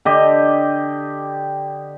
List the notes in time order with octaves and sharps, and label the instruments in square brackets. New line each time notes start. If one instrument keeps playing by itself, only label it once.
[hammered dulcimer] D3 G4 D#5